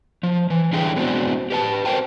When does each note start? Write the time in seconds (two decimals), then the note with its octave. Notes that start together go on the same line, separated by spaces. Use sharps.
0.23 F3
0.50 E3
0.73 D3 G3 G#3 E4 G#4 G5
0.96 G#3 B3 C4 D4 E4 F#4
1.50 G4 B4 A5
1.85 C4 F#4 A#4 C5 G5 A5